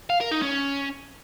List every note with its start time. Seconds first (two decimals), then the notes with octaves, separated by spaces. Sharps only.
0.10 F5
0.21 A#4
0.32 D#4
0.43 C#4